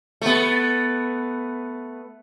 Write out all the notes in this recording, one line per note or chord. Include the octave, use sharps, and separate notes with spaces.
A3 B3